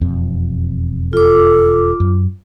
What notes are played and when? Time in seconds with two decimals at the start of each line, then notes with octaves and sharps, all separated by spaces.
0.01 E1 F2 C4
1.13 F4 A4 D6
2.00 F#2